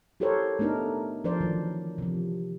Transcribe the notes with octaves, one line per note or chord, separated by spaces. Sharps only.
E4 G4 A4 A#4 C5 C#5
A3 B3 D4 D#4 A#4
F3 D4 A#4 C5 D5
D#3 E3 F#3
C3 F3